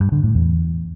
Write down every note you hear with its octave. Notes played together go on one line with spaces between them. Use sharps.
G2
D3
A2
E2